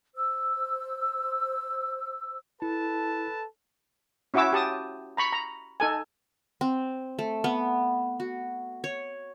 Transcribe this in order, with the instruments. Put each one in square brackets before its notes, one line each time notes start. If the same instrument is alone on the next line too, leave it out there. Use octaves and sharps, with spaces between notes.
[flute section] C5 E6
[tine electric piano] E4 [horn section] A4 B4 A5
[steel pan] C#4 E4 F#4 C#5 D6 E6
G4 A5 D#6
A#5 B5 C#6
A#5
D#4 A4 G#5
[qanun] C4
A3
B3
F#4
C#5